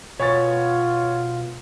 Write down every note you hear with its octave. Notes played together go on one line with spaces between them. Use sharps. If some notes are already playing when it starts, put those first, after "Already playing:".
B2 F4 B4 C#5 G#5 A6